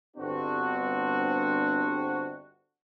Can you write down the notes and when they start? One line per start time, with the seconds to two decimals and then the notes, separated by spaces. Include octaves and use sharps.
0.17 G1 C4 D4 F#4